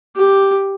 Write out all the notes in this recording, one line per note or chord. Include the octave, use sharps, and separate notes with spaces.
G4